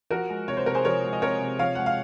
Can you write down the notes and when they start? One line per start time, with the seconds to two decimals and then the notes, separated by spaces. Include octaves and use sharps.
0.10 F3 F#4 A#4
0.29 G#3
0.48 C3 C#5
0.57 C5
0.66 C3 A#4
0.75 G#4 C5
0.85 F3 A#4 C#5
1.04 G#3
1.13 D#5
1.21 C3 A#4 C#5
1.41 C3
1.59 F3 C#5 F5
1.75 G#3 F#5
1.86 F5